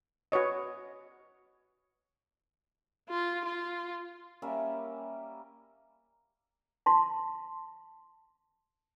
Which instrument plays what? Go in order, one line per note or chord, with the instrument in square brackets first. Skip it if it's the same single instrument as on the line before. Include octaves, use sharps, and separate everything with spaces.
[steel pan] F#4 B4 C#5 D#5
[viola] F4
F4
[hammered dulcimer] G3 A#3 C#4 E5
[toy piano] A5 C6